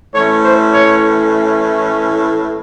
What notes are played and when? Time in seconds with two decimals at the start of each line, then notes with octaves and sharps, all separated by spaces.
0.14 A2 E3 A3 C#4 C#5
0.45 C5
0.73 C#5